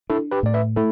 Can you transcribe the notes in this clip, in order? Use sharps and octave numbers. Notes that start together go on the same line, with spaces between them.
D4 E4 A4
G4 B4
A2 D5
B4 E5
A3 E4 A4